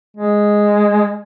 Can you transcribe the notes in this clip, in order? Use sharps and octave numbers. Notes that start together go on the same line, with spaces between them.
G#3